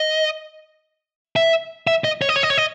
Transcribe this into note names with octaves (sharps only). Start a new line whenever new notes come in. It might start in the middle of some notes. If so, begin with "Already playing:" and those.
Already playing: D#5
E5
E5
D#5
C#5
D#5
C#5
D#5
C#5
D#5